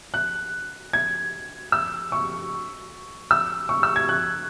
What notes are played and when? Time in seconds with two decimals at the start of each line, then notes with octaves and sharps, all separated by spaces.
0.14 F#6
0.93 G#6
1.72 E6
2.12 C#6
3.31 E6
3.69 C#6
3.83 E6
3.96 G#6
4.09 F#6